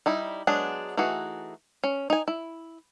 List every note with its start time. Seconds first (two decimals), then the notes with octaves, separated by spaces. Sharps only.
0.06 G3 D#4 E4
0.47 F#3 G#3 B3 D4 G#4
0.97 E3 A3 D#4 F#4 G#4
1.84 C#4
2.10 D#4 G#5
2.28 E4